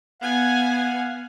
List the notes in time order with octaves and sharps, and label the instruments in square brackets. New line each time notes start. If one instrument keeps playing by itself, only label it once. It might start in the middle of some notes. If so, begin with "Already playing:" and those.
[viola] B3 G#5 [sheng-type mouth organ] F5 F#5